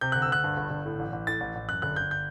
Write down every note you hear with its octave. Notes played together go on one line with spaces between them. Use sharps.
C3 G6
D2 F#6
E6
D2 F#6
G2
G1
G1
A2
A1
A1
A2 A6
A1
A1
F#2 F#6
G1 F#6
G1 G6
G6